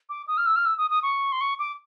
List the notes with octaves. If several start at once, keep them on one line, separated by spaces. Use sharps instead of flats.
D6
D#6
F6
E6
F6
E6
D#6
D#6
C#6
C6
C#6
D6